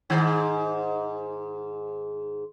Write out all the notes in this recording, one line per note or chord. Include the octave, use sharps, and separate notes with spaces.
G#2 D#3 C5